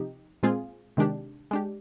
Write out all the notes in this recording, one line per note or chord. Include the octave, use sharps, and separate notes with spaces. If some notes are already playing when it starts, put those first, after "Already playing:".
Already playing: C3 F3 D#4 G4
A#2 G#3 C4 F4 G#4
C3 D#3 G#3 D4 G4
G#3 D4 G4